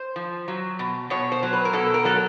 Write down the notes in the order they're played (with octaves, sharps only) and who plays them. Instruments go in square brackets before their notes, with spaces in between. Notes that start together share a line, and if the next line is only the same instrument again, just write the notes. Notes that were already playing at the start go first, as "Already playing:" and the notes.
Already playing: [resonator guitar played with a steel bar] C5
F3
F#3
B2
B2 C#5
C5
F#3
B4
A#4
B2 A4
A#4
F#3 A4